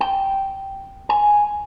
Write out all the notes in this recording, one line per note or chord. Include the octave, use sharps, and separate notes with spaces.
G5
G#5